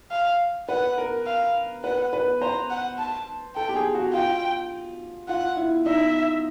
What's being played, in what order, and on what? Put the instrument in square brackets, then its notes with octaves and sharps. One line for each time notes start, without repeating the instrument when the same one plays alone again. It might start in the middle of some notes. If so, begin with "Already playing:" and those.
[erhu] F5
[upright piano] B4 [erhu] F#5
[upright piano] A#4
[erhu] F5
[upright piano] B4 [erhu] F#5
[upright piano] B4
[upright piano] C5 [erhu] A#5
[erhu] F#5
A5
[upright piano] A4 [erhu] G5
[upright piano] G4
G#4
F#4
[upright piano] F4 [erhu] G5
[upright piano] F4 [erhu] F#5
[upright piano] E4
[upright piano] D#4 [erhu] E5